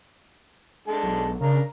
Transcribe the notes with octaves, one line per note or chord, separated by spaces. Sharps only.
G#3 D4 A4
B1
C#3 D4 A#4